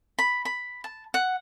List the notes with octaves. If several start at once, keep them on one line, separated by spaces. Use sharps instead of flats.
B5
B5
A5
F#5